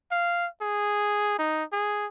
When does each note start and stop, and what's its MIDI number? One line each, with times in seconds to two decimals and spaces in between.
0.11 0.47 77
0.61 1.36 68
1.39 1.64 63
1.72 2.06 68